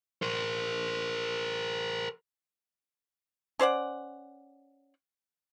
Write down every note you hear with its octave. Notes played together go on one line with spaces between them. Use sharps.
A#4 C5
C#4 C5 D5 F#5